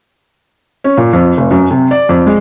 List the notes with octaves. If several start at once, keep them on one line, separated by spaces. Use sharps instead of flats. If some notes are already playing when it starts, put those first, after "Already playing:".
C#4
A#2
F2
F1
F#2
C3
D5
F2
G#3